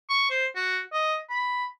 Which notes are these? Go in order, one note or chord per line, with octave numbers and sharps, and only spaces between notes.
C#6
C5
F#4
D#5
B5